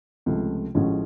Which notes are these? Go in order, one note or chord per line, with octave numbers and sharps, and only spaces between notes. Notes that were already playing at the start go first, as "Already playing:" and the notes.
C#2 C3 F3 A3
A1 A2 F3 G#3 C#4